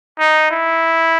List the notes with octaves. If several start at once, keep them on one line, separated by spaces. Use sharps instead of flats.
D#4
E4